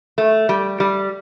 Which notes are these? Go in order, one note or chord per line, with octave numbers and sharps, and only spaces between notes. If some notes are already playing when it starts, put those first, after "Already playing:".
A3
G3
G3